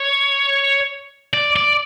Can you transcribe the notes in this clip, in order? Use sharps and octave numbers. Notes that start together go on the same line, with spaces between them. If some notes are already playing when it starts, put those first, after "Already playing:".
Already playing: C#5
D5
D5